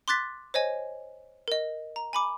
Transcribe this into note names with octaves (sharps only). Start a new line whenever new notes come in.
C6 D6 F#6 A6 B6
C5 C#5 D#5 G#5
A#4 D#5
A#5
G#5 B5 D6